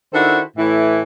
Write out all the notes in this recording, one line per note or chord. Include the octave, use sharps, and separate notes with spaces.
D#3 D4 E4 F#4 A4 C5
A2 E3 E4